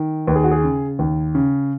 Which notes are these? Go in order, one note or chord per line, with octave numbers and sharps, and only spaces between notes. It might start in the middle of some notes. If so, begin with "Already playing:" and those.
Already playing: D#3
D#2 B4
G#4
F#4
G#4
C#3
D#2
C#3